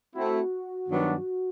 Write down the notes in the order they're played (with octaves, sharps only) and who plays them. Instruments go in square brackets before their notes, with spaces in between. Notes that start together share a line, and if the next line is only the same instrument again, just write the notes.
[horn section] A3 C4 E4 [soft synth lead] F#4
[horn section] G2 D#3 F#3 B3 D4